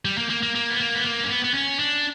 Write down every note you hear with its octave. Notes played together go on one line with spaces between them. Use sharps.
G3
A#3
A#3
A#3
A#3
B3
A#3
B3
A#3
C#4
B3
B3
C#4
D4